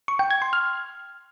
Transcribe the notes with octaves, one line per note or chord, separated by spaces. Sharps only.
C#6
G5
G#6
C6
F6